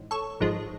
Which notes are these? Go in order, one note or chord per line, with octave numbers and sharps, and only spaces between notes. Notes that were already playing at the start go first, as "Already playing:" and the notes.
Already playing: A1 G#2
A4 C#5
G#1 G#2 F3 G#3